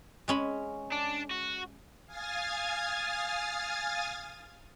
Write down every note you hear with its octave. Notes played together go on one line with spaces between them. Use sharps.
G#3 C#4 B5
D4
F#4
F5 G#5 D#6 F6 G#6 A6